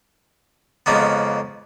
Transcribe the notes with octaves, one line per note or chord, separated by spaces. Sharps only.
F2 C#3 G#3 A#3 B3